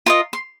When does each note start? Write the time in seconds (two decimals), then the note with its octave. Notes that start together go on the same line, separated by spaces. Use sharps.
0.06 F4 A#4 D#5 C6
0.33 C6